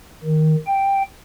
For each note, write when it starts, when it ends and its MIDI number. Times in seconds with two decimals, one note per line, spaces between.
0.24 0.56 51
0.66 1.02 79